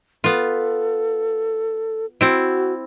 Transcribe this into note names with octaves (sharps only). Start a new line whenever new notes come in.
B3 F4 A4
C4 E4 F#4